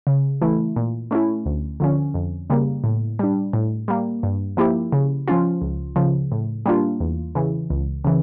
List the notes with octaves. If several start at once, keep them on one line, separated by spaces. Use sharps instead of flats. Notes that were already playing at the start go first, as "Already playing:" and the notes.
C#3
E3 A3 E4
A#2
A3 C#4 E4
D2
D3 F3 C#4
F2
C#3 G3 A#3
A2
G3 D4
A2
G3 A#3
G2
F3 A#3 E4 G4
C#3
F3 C#4 F4
C#2
C#3 F3
A2
G3 A#3 D4 F4
E2
C#3 E3
C#2
C#3 E3